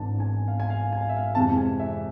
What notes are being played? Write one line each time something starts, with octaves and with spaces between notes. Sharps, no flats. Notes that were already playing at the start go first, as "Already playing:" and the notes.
Already playing: G#1 G#2 E3 B3 D4 A5
G#5
F5
G#5
F5
G#5
F5
E5
F5
F2 C3 E3 G#3 A5
G#5
E5